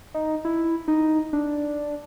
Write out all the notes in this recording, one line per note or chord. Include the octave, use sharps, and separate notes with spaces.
D#4
E4
D#4
D4